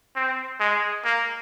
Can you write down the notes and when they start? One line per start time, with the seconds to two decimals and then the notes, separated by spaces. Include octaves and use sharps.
0.16 C4
0.60 G#3
1.05 A#3